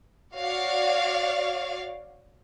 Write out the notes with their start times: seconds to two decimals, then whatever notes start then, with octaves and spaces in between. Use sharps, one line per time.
0.38 F#4 C#5 D5 F5